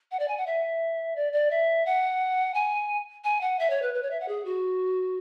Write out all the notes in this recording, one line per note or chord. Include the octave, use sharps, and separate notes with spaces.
F#5
D5
G#5
F#5
E5
D5
D5
E5
F#5
G#5
G#5
F#5
E5
C#5
B4
B4
C#5
E5
F#5
G#4
F#4